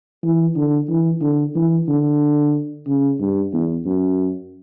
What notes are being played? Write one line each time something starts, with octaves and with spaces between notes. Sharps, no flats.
E3
D3
E3
D3
E3
D3
C#3
G2
E2
F#2